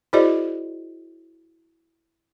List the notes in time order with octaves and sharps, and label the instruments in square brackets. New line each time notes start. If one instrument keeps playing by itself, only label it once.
[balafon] E4 F#4 G#4 C5 D5 D#5